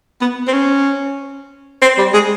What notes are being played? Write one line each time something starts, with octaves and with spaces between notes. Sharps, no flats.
B3
C4
C#4
C4
G3
G#3